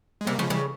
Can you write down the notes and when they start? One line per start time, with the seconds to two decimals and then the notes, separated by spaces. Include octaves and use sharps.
0.21 G#3
0.27 C3 G3 A#3
0.39 C#3 F3 G#3
0.50 C#3 E3 G3